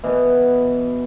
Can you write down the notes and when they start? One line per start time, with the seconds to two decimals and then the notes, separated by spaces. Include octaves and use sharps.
0.04 B2 E3 B3